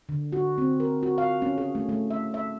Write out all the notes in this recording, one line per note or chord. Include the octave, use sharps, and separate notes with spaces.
D3
F#4
C4
A#4
F#4
F5
C#4
G#4
A3
A3
E5
E5